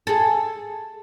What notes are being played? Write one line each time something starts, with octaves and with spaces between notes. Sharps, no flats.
G#4 A4